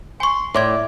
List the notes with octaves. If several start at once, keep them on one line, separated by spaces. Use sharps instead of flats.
G#5 C6 C#6
A2 D5 C6 D6 G#6